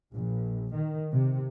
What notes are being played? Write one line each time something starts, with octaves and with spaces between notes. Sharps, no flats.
A#1
D#3
C3